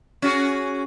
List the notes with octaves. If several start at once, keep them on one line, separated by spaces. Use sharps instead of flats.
C#4 F#4 G#4